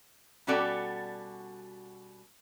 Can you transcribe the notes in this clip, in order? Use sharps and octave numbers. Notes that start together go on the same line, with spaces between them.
B2 G3 C#4 F#4 A4 D5